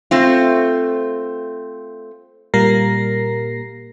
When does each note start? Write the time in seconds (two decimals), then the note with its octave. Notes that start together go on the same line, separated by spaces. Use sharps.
0.11 A3 C4 F4
2.54 A#2 G3 A#3 A#4 A#6 C7